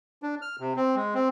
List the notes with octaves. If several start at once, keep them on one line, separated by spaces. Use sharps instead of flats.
D4
F6
C3
C4
G#3
C4